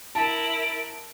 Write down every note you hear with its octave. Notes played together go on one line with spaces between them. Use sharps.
E4 A#4 A5 D7